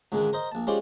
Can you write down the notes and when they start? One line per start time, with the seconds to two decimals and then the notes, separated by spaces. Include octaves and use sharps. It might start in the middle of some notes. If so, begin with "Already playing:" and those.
0.12 C#2 G#2 D3 D#3 G#3
0.33 A#4 C5 D#5 A#5
0.52 A#1 A5
0.67 G#3 C#4 F4 G4 C5 D5